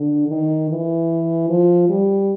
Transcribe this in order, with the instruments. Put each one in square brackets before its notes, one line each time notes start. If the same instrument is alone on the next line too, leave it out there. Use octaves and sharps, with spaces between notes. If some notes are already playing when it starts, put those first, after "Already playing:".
Already playing: [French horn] D3
D#3
E3
F3
G3